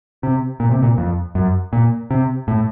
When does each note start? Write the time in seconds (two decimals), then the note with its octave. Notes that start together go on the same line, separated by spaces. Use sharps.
0.23 C3
0.60 A#2
0.71 C3
0.83 A#2
0.98 F2
1.35 F#2
1.73 A#2
2.11 C3
2.48 A2